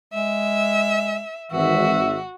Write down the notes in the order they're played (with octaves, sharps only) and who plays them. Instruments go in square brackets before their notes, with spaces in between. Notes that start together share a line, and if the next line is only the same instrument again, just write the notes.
[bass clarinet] G#3 [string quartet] E5
[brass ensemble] G#1 E5 [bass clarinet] E3 [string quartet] F#4